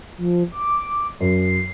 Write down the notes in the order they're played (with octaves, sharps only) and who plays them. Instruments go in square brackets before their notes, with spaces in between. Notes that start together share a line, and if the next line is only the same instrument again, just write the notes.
[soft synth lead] F3
D6
[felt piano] F#2 [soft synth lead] C7